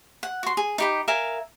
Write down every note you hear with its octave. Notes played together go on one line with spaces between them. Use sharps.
F#5
F#4 C6
G#4
D#4 G4 B5
A#4 E5 F5 G#5